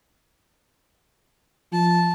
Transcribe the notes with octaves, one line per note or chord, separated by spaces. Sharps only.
F3 A5